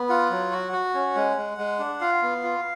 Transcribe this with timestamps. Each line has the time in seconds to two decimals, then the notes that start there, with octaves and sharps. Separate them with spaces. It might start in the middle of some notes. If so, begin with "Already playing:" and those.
Already playing: B3
0.09 F4 F#5
0.30 F#3
0.51 F#4
0.72 F#4
0.94 C#4
1.15 G#3
1.37 G#3
1.58 G#3
1.79 D4
2.01 F4 F5
2.22 B3
2.43 F4